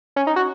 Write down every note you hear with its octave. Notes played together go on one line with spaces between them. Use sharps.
C#4
D#4
F#4